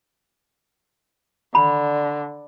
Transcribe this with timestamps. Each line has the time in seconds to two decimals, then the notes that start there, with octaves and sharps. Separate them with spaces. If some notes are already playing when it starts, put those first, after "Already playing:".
1.55 D3 B5